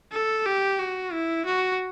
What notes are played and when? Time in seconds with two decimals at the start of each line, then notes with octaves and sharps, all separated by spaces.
0.12 A4
0.46 G4
0.79 F#4
1.12 E4
1.46 F#4